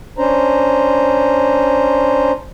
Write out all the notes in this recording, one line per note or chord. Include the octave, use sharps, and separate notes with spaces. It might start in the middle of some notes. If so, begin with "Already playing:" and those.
C#4 D4 C5 A#5